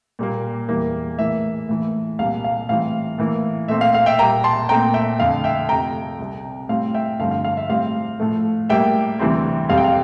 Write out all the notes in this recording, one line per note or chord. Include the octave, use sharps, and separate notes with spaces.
A#2 G3 A#3
E2 E3 G3 A#3
A2 E3 A#3 E5
A2 E3 A#3
C2 A#2 G3 F5
F5
A2 E3 G3 C4 F5
A2 E3 A#3
A#2 A3 C4 E5
F5
F5
E5 G5
A#2 G3 A#3 G5 A#5
A5 C6
A#2 A3 C4 G5 A#5
E5 G5
F2 D3 A3 F5
E5 G5
F2 C3 F3 A3 G5 A#5
C2 C3 G3
A2 G3 C4 F5
E5 G5
G2 D3 F3 A3 C4 F5
F5
F5
E5
A2 G3 C4 F5
A2 F3 A3
A2 G3 A#3 E5 G5
D2 C3 E3 G3 C4
F2 C3 G3 C4 F5
G5
F5